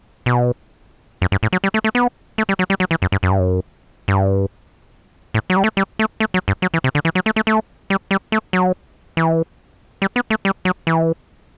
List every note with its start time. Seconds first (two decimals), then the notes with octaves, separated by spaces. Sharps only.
0.26 B2
1.22 F#2
1.32 G2
1.43 A2
1.53 F#3
1.64 G3
1.74 A3
1.84 A3
1.95 B3
2.38 A3
2.49 G3
2.59 F#3
2.70 G3
2.80 F#3
2.91 E3
3.02 F#2
3.12 G2
3.23 F#2
3.31 G2
3.40 F#2
4.08 G2
5.34 A2
5.50 F#3
5.57 G3
5.64 A3
5.77 G3
5.99 A3
6.20 A3
6.34 F#3
6.48 G2
6.62 F#3
6.74 E3
6.84 C3
6.95 D3
7.05 E3
7.15 F#3
7.26 A3
7.36 A3
7.47 A3
7.90 G3
8.11 G3
8.32 A3
8.53 F#3
9.17 E3
10.02 G3
10.16 B3
10.30 A3
10.45 G3
10.65 F#3
10.87 E3